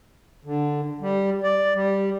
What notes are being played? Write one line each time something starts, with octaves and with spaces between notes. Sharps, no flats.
D3
G3
D5
G3